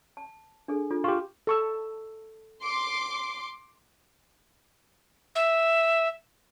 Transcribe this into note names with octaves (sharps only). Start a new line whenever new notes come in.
A5
D4 G#4 A4
D4 F4 A4
F4 G4 C#6
A4 C#6 E6
C6 D6
E5